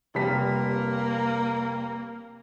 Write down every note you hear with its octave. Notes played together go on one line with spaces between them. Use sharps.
F1 G3 A#3 B6